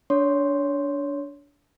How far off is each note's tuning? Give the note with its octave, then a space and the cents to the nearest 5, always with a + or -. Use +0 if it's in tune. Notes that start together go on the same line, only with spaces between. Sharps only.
D4 -20 C#5 +15 C6 +0